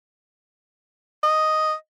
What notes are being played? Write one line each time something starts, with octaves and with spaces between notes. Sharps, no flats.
D#5